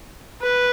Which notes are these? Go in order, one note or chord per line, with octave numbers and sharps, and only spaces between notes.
B4